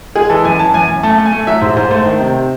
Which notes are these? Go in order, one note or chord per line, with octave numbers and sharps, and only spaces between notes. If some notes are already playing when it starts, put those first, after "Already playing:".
G#3 G#4
E3 A4
F#2 G#5
E3 A5
F#2 G#5
F#2
A3 A5
A3
G#5
A3
F#3 E5
G#2 C5
G#2 C5
A3 C5
D#3
C3